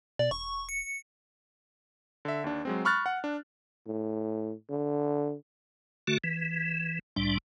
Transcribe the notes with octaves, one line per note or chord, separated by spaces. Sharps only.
B2 D5
E1 C#6
C#7
D3 E5
D#2 D4
F#3 G#3 C4
B5 C#6 F6 F#6 A6
F#5
D4
A2
D3
D3 A3 F#4
E3
C2 A2 G3 D4